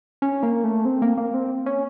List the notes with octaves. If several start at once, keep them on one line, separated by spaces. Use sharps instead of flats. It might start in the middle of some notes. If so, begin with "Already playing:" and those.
C#4
A#3
A3
C4
A#3
A#3
C4
C#4